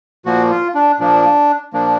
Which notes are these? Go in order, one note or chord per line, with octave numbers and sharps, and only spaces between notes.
A#2 F3 A#3 F#4
F4
D4
A#2 F3 A#3 D4
A#2 F3 A#3 D4